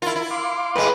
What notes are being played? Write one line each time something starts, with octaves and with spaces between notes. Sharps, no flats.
E4 F4 A#4
E4
F5 C6 D6
A2 G#3 B4